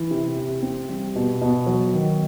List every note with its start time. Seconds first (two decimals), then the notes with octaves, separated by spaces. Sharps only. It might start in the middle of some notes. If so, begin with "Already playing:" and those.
Already playing: E3
0.11 C3
0.36 C3
0.62 C4
0.89 G3
1.16 B2
1.41 B2
1.66 F#3
1.93 D#3